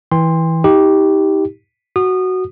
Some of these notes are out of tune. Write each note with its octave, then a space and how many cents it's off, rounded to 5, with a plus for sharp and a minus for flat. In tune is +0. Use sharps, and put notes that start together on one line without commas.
E3 -15 G5 +40 C6 +0
D#4 +35 G4 +0
F#4 +0 D#6 -30